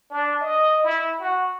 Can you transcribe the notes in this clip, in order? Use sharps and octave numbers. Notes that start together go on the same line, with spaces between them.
D4
D#5
E4
F#4